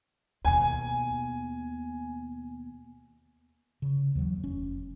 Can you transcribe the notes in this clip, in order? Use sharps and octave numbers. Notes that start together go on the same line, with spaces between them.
D#2 B2 G#5
C#3
D#2 E3 F#3
F1 C#4